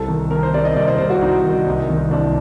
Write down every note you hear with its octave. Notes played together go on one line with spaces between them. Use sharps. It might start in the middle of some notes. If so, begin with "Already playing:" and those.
Already playing: C2 A4
D#3
D#3 A#4
C5
C3 D5
D#5
C2 D5
C5
C2 C5
F#4
C2 D#4
D#3
C2
D#3
C2 D4